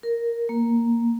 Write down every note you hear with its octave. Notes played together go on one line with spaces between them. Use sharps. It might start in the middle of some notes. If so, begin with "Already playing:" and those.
A#4
A#3